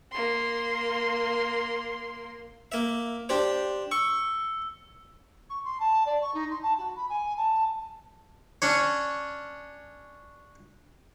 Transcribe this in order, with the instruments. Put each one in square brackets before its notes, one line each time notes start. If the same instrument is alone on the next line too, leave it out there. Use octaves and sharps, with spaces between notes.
[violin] A#3 C6
[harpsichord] A#3 E5
D4 G4 C5
[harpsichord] C#6 [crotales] E6
[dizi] C#6
C6
A5
D5
C#6
D#4
C6
A5
F#4
B5
G#5
A5
[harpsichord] C#4 D4 C#5